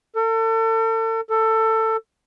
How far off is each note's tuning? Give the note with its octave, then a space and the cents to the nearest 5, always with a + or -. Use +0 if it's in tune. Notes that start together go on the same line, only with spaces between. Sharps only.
A4 +40
A4 +20